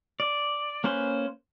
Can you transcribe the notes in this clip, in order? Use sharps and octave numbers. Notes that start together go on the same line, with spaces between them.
D5
A#3 C#4 B4 C5